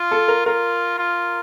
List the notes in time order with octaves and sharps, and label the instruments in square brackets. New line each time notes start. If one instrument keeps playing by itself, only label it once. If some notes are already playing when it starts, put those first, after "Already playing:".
Already playing: [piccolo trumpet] F4
[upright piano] A4
A#4
[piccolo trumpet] F4 [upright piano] A#4
[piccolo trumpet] F4